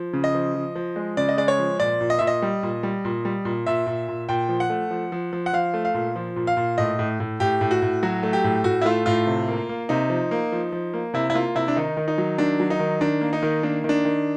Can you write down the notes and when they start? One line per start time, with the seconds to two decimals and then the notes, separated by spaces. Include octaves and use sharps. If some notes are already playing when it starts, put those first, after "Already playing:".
Already playing: F3
0.13 C#3
0.24 D#5
0.35 F3
0.55 F3
0.75 F3
0.96 G#3
1.17 C#3 D5
1.29 D#5
1.37 G#3 D5
1.48 C#5
1.59 F3
1.80 A#2 D5
2.01 A#2
2.10 D#5
2.19 A#2 E5
2.27 D#5
2.42 G3
2.63 A#2
2.83 G3
3.05 A#2
3.25 G3
3.45 A#2
3.66 A#2 E5
3.87 A#2
4.08 A#2
4.29 A#2 G5
4.49 F3
4.60 F#5
4.70 A3
4.91 F3
5.12 F3
5.33 F3
5.46 F#5
5.53 F3 F5
5.74 A3
5.85 F5
5.94 A#2
6.16 F3
6.36 A#2
6.47 F5
6.57 A#2
6.78 A2 D#5
6.99 A2
7.20 A2
7.40 A2 G4
7.61 A2
7.71 F#4
7.82 A2
8.03 F#3 F#4
8.23 A3
8.33 G4
8.44 A2
8.64 A2 F#4
8.81 E4
8.85 A3 F4
9.06 A2 F4
9.27 C3
9.49 A#3
9.69 A#3
9.89 C3 D#4
10.10 F3
10.31 A#3
10.52 F3
10.72 F3
10.94 A#3
11.14 C3 E4
11.30 E4
11.34 A#3 F4
11.55 C3 E4
11.68 D4
11.76 D#3 D#4
11.97 D#3
12.08 D#4
12.18 F#3
12.38 D#3 D4
12.60 F#3
12.70 D#4
12.80 D#3
13.01 D#3 D4
13.21 A#3
13.33 D#4
13.43 D#3
13.63 A#3 D4
13.84 D#3 D4
14.05 D#3